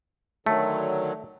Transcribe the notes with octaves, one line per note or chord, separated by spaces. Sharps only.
D3 D#3 F#3 A3